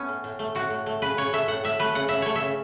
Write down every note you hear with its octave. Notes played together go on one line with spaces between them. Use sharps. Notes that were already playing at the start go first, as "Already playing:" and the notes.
Already playing: A3 B3 C#4
A2
A2
A3
A2 F#4
A2
A3
C#3 B4
C#3 C#5
A3 E5
A2 F#5
A2 E5
A3 B4
C#3 F#5
C#3 E5
A3 C#5
E5
C#3